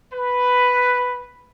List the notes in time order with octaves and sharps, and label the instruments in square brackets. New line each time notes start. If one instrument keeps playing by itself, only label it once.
[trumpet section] B4